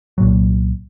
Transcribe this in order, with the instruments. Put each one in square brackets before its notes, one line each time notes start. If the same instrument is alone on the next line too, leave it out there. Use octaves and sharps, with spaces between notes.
[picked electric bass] C2 A#2 F#3